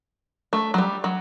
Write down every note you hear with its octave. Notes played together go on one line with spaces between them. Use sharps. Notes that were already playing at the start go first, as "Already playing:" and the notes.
A3
F#3
G3
F#3